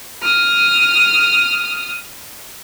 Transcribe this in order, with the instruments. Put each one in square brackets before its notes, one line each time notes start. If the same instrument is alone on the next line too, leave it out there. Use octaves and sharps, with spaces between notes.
[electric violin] D#6 F6